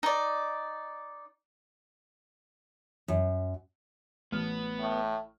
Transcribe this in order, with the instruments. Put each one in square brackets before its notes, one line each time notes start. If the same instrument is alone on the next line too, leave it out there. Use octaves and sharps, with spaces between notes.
[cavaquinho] D#4 D5
[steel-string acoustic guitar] F#2
[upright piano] A1 A5 F6 [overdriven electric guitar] B3
[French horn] A2